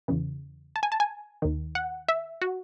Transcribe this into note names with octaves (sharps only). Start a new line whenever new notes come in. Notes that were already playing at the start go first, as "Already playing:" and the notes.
E2 C#3 E3
A5
G#5
A5
G#5
D#2 D#3
F#5
E5
F#4